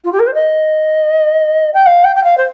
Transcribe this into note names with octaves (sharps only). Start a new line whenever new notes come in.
F4
G4
A#4
C5
D#5
G5
F5
G5
G5
F5
C5